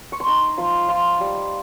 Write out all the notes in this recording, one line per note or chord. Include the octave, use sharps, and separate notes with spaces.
C#6
C6
D#4 A#5
F3 C6
F4 C6
G3